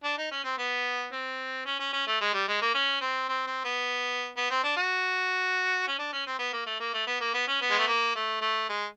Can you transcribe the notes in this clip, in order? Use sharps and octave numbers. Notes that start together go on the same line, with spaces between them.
D4
D#4
C#4
C4
B3
C4
C#4
C#4
C#4
A3
G#3
G3
G#3
A#3
C#4
C4
C4
C4
B3
B3
C4
D4
F#4
C#4
D4
C#4
C4
B3
A#3
A3
A#3
A3
B3
A#3
B3
C#4
B3
G#3
A3
A#3
A3
A3
G#3